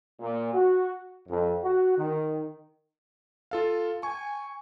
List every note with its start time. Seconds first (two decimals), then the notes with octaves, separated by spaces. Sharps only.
0.20 A#2
0.53 F#4
1.29 F2
1.63 F#4
1.98 D#3
3.51 F4 A4 F5
4.03 G#5 C#6